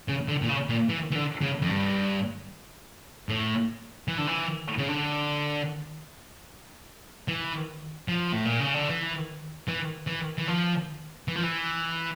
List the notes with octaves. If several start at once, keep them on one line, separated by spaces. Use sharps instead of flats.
C#3
D3
A#2
C#3
A#2
E3
E3
D3
C#3
F2
G2
A2
E3
D3
E3
C#3
D3
E3
F3
A2
A#2
C#3
D3
E3
E3
E3
E3
F3
E3
F3
E3